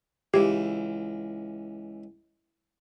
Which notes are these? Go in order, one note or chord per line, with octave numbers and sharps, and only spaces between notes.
C#2 E3 G4